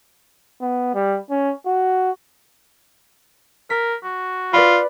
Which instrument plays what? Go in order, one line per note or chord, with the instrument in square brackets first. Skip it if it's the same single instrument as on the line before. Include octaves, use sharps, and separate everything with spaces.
[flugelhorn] B3
G3
C#4
F#4
[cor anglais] A#4 [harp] B6
[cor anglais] F#4
[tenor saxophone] F4 [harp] B4 D5 B5